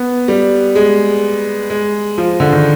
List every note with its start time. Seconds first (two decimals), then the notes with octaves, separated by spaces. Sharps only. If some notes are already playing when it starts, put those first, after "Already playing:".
Already playing: B3
0.28 G3
0.76 G#3
1.70 G#3
2.18 F3
2.40 D3
2.53 D#3